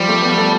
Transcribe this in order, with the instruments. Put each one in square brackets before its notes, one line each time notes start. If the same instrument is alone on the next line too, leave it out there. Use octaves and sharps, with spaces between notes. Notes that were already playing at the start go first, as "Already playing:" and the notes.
Already playing: [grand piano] F3 [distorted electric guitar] G3
[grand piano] A3
B3
A4